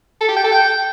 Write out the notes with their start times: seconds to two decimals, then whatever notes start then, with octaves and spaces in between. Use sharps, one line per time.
0.21 A4
0.29 G4
0.36 G5
0.44 A4
0.52 G5